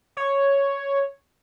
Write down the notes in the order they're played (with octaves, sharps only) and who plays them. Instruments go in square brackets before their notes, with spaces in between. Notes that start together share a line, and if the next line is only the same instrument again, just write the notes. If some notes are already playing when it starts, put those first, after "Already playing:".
[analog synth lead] C#5